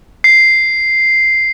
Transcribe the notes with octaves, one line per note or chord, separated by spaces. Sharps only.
C7